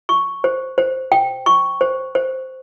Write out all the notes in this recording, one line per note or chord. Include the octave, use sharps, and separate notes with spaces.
C#6
C5
C5
G5
C#6
C5
C5